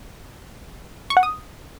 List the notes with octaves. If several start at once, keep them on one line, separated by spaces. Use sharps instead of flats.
C#6
F#5
D#6